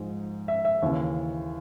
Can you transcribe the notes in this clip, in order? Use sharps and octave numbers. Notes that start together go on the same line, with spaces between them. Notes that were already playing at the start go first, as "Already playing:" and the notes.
Already playing: G#2 F3 G#3
E5
E5
D#2 C#3 E3